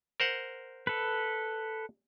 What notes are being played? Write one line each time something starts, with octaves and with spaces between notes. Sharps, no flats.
A#4 C5 F#5
A4 B4